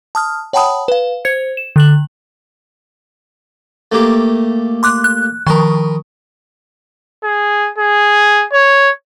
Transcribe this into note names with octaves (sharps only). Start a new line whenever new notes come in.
A5 D#6 F6
C#5 F#5 G5 A5 B5 D#6
B4 F5
C5 G#6 C#7
E7
D3 F#6 F#7
A3 A#3 G4
C6 D6 F#6
F#6
D#3 F3 A#4 B4 C6
G#4
G#4
C#5